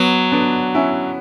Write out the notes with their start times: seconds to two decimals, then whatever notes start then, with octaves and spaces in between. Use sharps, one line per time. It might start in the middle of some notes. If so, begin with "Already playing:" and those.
Already playing: F#3 B3
0.32 B3 D4
0.75 C#4 E4